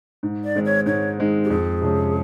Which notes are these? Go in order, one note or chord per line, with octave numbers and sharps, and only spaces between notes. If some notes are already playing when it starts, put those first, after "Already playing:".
G#2
D5
D#3 G#3 C4
C#5
G#2 C#5
D#3 G#3 C4
G4
F2 G#4
C3 F3 G#3 C#4